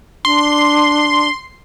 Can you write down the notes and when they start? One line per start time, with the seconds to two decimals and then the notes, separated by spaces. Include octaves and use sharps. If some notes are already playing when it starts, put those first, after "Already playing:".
0.25 D4 C6